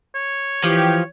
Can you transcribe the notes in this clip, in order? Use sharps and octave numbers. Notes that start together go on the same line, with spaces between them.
C#5
E3 F3 G4